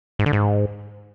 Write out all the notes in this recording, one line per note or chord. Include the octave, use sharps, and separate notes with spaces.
G#2
D3
G#2